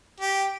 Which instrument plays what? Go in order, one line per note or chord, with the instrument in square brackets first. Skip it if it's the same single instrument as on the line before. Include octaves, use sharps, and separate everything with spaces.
[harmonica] G4